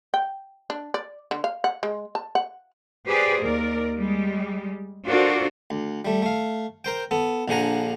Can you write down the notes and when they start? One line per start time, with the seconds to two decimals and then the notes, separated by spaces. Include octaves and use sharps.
0.14 G5
0.70 D4
0.94 D5
1.31 D3
1.44 F5
1.64 F#5
1.83 G#3
2.15 A5
2.35 F#5
3.08 G4 G#4 B4 C5 D5
3.42 D#2 A#4 D5
3.98 G3 G#3
5.06 D4 F4 F#4 A4 A#4 C5
5.70 D2
6.05 G3 A3
6.22 A3 F5
6.84 A#4 C5 G5
7.11 B3 A4
7.48 A#1 D3 F3 F#5 G#5 A#5